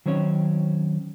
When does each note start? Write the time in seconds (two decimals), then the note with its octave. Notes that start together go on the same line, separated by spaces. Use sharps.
0.06 D#3 F#3 C4 C#4 C#5